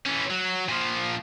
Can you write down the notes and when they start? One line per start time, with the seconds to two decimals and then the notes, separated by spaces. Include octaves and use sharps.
0.06 E3 C#4
0.30 F#3
0.68 A#2 F3